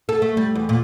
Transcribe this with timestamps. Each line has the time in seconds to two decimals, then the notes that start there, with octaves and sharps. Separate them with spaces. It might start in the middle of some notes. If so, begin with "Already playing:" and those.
0.09 A4
0.22 A3
0.37 G3
0.55 E2
0.69 A#2